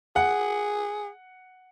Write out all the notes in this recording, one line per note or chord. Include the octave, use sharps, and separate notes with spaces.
G#4 F#5